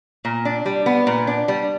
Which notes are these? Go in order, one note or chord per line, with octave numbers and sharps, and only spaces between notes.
A#2
D4
G3
B3
A#2
D4
G3